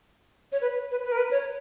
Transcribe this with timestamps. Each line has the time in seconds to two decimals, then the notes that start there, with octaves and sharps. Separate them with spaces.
0.52 C#5
0.61 B4
0.91 B4
1.04 B4
1.12 A#4
1.17 B4
1.31 C#5